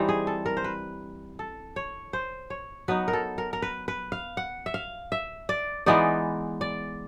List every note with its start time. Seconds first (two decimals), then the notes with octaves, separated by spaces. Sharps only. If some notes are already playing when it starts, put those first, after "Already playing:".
Already playing: E3 G3 C4 D#4
0.09 G#4
0.27 A4
0.46 A#4
0.57 C5
0.64 B4
1.39 A4
1.76 C#5
2.13 C5
2.50 C#5
2.88 F#3 B3 D#4 B4
3.08 A#4
3.13 A4
3.38 A#4
3.53 A#4
3.62 B4
3.88 B4
4.12 F5
4.37 F#5
4.66 E5
4.74 F5
5.12 E5
5.49 D5
5.86 E3 G#3 B3 D#4 D5
6.61 D5